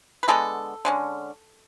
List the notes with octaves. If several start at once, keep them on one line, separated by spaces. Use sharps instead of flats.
B4
D3 G#3 B3 A4
D3 G#3 C#4